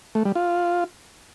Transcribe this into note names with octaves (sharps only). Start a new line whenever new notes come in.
A3
G3
F4